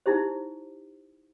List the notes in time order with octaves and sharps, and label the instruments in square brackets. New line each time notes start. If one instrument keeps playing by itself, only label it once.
[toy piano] D#4 E4 G4 C5